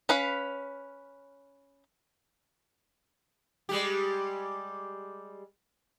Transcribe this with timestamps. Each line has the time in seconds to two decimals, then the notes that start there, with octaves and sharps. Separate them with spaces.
0.09 C#4 B4 F5
3.69 G3 G#3 G4